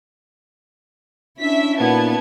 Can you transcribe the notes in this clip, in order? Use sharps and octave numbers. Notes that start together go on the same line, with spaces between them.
C#4 D4 E4 E5 B6
A#2 B3 D#4 A5 G#6